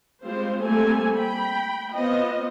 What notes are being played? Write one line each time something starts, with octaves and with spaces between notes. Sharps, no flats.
G3 G#3 C4 F4 C5
G3 A3 A#3 C4 A4 G#5
G5 B5
B3 C4 F4 D#5